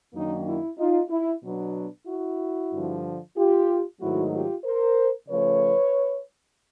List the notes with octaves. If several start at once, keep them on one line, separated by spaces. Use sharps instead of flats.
F#2 D#3 F#3 A#3 D4 D#4
E4
D#4 F4
E4
B2 F#3 B3 D4
E4 F#4
G2 D3 F3
F4 G4
G#2 D#3 F#3 A3 E4 F#4
F4 G4
A#4 C5
C#3 F3 A3 B4 C#5